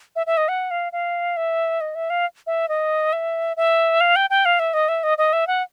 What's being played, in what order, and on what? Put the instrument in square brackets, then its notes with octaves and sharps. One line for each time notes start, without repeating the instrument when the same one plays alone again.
[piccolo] E5
E5
D#5
F#5
F5
F5
E5
D#5
E5
F5
E5
D#5
E5
E5
F5
G5
G5
F5
E5
D#5
E5
D#5
D#5
E5
F#5